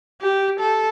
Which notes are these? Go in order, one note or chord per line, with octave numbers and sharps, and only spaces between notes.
G4
A4